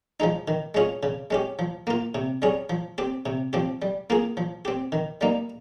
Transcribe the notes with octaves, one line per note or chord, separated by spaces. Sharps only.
F3 G#3 D#4
D#3
G#3 C#4 F4 G#4
C#3
G#3 C#4 G4
F3
A#3 F4
C3
G3 C#4 G#4
F3
C4 G4
C3
F3 C4 G4
G3
A#3 F4 G#4
F3
C4 G4
D#3
G3 A#3 D#4